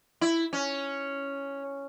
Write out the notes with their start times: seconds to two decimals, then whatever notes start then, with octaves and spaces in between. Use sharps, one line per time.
0.21 E4
0.53 C#4